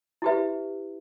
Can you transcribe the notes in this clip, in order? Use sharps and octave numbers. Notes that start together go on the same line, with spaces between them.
E4 G4 B4 E5